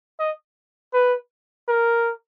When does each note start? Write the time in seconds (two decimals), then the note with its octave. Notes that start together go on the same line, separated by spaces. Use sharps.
0.20 D#5
0.94 B4
1.68 A#4